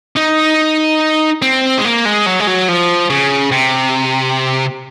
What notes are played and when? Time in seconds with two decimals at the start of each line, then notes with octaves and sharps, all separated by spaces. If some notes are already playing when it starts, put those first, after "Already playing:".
0.17 D#4
1.42 C4
1.78 G#3
1.85 A#3
2.05 G#3
2.26 F#3
2.40 G#3
2.47 F#3
2.68 F3
3.10 C#3
3.51 C3